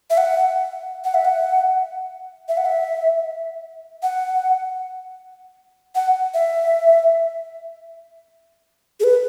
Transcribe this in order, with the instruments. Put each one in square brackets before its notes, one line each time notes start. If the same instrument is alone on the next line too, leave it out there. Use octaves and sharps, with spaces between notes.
[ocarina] E5
F#5
F#5
E5
F#5
E5
F#5
E5
F#5
F#5
E5
G#4
B4